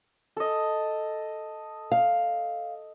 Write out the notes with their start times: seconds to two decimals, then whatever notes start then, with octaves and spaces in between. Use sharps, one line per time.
0.36 A4 D#5
1.92 F5